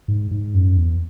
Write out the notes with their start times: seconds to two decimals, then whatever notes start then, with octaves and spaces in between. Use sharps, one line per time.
0.08 G#2
0.31 G#2
0.54 F#2
0.77 E2